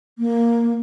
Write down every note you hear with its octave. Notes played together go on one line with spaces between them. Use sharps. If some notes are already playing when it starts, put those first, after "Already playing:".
A#3